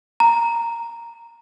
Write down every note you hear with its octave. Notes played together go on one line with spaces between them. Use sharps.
A#5